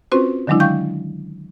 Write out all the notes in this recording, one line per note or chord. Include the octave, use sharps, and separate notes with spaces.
C4 C#4 F4 F#4 B4 C5
D3 D#3 F#3 G#3 D4 E4
F5 G5 C#6 G6